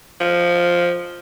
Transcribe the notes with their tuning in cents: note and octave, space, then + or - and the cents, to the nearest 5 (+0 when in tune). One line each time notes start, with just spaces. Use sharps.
F3 +0